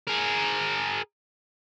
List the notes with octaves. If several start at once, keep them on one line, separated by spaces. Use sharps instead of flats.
G#4 A#4